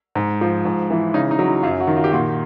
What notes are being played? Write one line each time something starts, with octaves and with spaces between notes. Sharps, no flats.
G#2
F3
G#2
E3
C#3 D#4
D#4
F#3
E4
F#2 F4
F#4
D#3
F4
G4
A#2 F#4